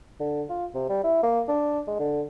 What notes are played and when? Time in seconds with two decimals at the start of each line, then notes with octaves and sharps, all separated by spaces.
0.20 D3
0.49 F4
0.75 C3
0.89 G3
1.04 E4
1.23 A#3
1.48 D4
1.88 G#3
2.00 D3